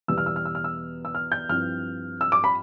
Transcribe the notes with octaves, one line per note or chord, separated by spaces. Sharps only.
E2 B2 G3 B3 E6
F6
E6
F6
E6
F6
E6
E6
F6
G6
G2 F3 C4 E4 F6
E6
D6
B5